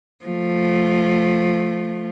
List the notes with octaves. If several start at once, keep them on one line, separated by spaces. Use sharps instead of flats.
F3 A3